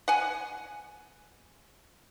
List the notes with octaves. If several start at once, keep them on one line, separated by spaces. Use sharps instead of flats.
F#5 G#5